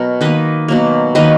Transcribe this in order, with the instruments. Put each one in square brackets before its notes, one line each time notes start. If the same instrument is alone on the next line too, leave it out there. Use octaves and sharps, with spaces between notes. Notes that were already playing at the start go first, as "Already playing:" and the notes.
Already playing: [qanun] B2 F#3 A#4 C#5
D#3 A#3 B4 D#5
B2 F#3 A#3
D#3 F#3 A#3 B4 D#5